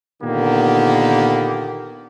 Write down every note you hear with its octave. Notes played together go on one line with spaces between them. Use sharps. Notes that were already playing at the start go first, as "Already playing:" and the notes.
A#2 D3 D#3 A#3 B3 G4